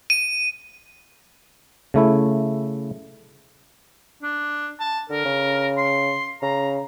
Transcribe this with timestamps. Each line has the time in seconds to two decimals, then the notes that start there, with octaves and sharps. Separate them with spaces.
0.10 D#7
1.94 C#3 A3 E4
4.22 D4
4.80 A5
5.10 D3 A#4
5.25 C#3
5.77 C6
6.42 C#3 A#5